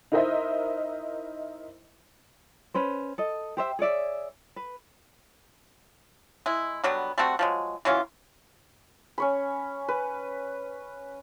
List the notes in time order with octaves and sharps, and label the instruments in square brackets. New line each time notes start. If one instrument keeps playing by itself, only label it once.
[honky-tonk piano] D#4 E4 A#4 C5 D#5 E5
[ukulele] C#4 B4 C5
A4 D#5
G4 C5 E5
G#4 C#5 D5 E5
B4
[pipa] G#3 E4
D3 F#3 G3 B3
G3 A3 C4 F#4
F3 F#3 G#3
E3 F#3 C#4 F4
[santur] C#4 C#5 B5
B4